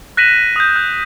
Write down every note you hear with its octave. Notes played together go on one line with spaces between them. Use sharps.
F#6 A#6 B6 D#7 E7 F#7
D#6 G6
F#6